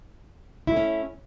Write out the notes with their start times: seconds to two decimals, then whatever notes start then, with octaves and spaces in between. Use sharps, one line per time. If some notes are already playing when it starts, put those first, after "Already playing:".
0.67 E4
0.72 A3
0.76 C#4